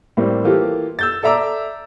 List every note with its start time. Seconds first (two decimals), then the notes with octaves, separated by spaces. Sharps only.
0.17 A2 G3 A#3 C4
0.44 E3 A#3 F4 G4 A4
0.99 E6 G6 A6
1.23 A4 D5 E5 A#5 D6 E6